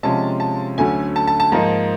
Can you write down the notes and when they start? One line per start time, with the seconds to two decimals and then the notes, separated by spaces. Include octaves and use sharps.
0.03 C3 F3 G#3 C#4 F4 A5
0.40 A5
0.78 D2 D3 F#3 A3 C#4 G#5
1.16 A5
1.27 A5
1.40 A5
1.52 G#2 F3 A#3 D#4 A5